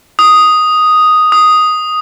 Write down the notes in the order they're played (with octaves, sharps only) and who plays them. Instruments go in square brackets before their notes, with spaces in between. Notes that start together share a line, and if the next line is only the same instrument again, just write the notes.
[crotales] D#6
D#6